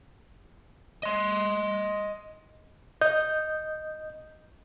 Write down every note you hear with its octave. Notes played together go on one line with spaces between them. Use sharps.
D#5 C6
D#5 G6